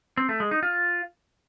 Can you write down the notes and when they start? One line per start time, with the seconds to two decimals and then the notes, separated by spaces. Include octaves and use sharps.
0.17 C4
0.29 A3
0.40 G#3
0.51 D#4
0.63 F4